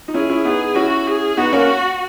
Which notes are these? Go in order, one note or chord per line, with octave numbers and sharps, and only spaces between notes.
D#4
C#4 E4 G#4
C#4 E4
B3 D#4 G#4
C#4 E4 F#4
G#4
B3 D#4 F#4
A#3 C#4